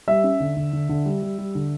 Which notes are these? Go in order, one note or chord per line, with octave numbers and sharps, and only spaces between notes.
G3 E5
C#4
D3
D3
D3
D3
G3
G3
G3
D3